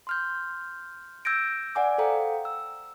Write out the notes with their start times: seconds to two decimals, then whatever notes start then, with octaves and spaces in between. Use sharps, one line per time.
0.07 C6 F6 G6
1.25 E6 G6 G#6 A#6 D7
1.75 D5 F#5 G#5 D6
1.98 A4 C5 F5 G5 A#5
2.45 E6